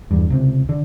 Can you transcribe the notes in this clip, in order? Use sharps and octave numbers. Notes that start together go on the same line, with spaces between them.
E2 G2
C#2 C3
D3